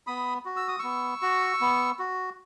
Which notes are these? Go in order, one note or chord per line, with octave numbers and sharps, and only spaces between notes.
B3 B5 D#6
F#4
E6
D#6
B3 C#6 E6
F#4
B3
F#4